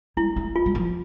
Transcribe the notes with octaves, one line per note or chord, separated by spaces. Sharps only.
G3 E4
A3
F4
G3
F3